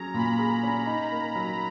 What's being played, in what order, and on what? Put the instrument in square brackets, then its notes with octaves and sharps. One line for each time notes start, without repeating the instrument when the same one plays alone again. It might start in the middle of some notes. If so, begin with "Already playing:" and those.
Already playing: [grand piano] F#3 C#4 G#4 [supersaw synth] A#5
[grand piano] A#2 [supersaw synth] B5
[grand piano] G#4
C#4
D#4
A#3
F#3